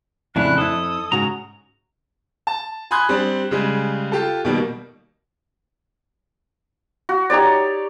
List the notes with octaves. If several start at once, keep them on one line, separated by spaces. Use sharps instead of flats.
F2 A2 C#3 D4 E4 F#6
F2 E4 A4 D#6
G#2 C#3 F#4 A#5
A5
G#5 B5 C6 D#6 F#6 G#6
G3 C4 D4
C#3 G3 G#3 G#4
F4 G4 A4
B2 D#3 G3 A#3
F#4
D#4 G4 C#5 D5